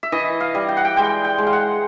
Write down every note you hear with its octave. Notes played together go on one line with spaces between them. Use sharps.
E5
E3 D#5
F5
G3
G5
F#5
G5
G#3 G5
G5
G#3
F5
F#5